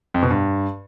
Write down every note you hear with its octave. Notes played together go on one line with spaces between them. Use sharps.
F2
B2
G2